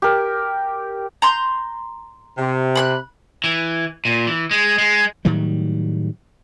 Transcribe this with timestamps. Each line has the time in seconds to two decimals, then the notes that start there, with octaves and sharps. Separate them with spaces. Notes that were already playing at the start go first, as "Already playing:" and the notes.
0.02 G4 A#4
1.22 A#5 C6 G6
2.38 C3
2.76 B5 C6 F#6
3.44 E3
4.05 A#2
4.27 E3
4.51 G#3
4.78 G#3
5.25 A2 D#3 F#3 G3